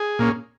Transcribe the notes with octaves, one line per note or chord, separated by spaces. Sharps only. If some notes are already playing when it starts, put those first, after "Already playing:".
Already playing: G#4
A#2 A#3 C#4